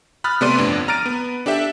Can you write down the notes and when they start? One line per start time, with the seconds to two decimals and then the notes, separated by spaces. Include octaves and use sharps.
0.24 B5 D#6 F6 F#6 A6
0.41 C3 A3 B3 D5 C6 D#7
0.58 G1 F2 D4
0.88 A#5 F6 A6 D7 D#7
1.06 B3
1.46 D4 G4 A4 E5 G5